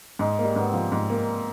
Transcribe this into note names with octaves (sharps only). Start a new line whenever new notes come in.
G#2 G#3
A#3
G3
G#2 B3
C4
F3
G#2
A#3